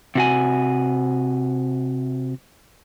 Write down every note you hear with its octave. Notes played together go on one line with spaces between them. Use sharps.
C3 F#4 G#5